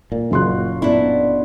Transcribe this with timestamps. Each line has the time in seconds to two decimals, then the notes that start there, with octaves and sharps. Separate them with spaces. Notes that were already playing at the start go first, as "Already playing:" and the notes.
0.12 A#2
0.31 F#1 C#4 F4 F#4 C6 F#6
0.82 B3 D4 E4